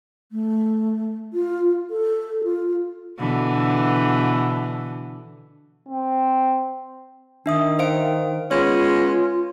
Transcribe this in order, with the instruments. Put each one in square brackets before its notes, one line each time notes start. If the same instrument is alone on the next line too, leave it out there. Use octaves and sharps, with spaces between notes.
[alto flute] A3
F4
A4
F4
[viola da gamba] B2 D3 E3
[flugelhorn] C4
[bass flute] D#3 [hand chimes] D4 E5 D#6
[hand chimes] C5 F5 D7
[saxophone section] G#3 B3 C#4 [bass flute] F4 [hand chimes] C#5